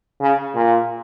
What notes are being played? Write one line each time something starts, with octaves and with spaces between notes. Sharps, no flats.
C#3
A#2